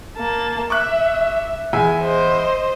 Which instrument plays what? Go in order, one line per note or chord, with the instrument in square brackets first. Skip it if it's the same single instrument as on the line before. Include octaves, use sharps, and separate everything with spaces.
[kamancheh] A#3 A5
[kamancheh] E5 [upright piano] C#6 D6 F#6
[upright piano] E2 G#4 E5 [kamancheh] G#5
[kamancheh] C5 D#5